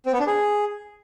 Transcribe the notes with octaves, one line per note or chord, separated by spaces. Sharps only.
C4
B3
D4
G#4